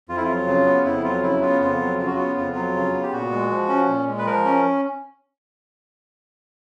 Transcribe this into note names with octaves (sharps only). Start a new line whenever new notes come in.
F2 F4
E4
F4
F#3
C#3
B3
F2 E4
F#3 F4
C#3 E4
B3 F4
F2 F4
F#3
C#3 F4
F#4
B3 F4
F2 F4
F#3
C#3
B3
G4
A#2 F#4
G#3
F3
C#4
A#2
G#3
B4
F3 A#4
C#4